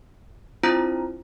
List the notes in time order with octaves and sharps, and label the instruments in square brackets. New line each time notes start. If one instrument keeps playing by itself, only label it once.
[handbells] C4 D4 E4 F4 C5 A#5